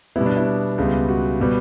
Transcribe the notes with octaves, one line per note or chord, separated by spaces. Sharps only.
B2 G3 B3 E4
D4
E4
C#2 C#3 G3 B3
F#4
B2 G3 B3